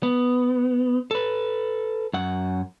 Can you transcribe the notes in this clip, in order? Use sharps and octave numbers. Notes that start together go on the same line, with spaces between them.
B3
A4 B4
F#2 F#5